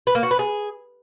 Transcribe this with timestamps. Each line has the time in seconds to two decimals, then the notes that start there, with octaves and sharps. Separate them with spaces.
0.07 B4
0.15 A#3
0.23 F#4
0.31 B4
0.39 G#4